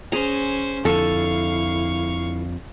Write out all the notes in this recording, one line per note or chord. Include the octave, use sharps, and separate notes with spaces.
C#4 G#4 C5 A#5
F2 D3 E4 A4 F5 C#6